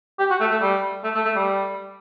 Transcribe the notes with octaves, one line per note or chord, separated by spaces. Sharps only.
G4
F#4
A3
A3
G3
A3
A3
A3
G3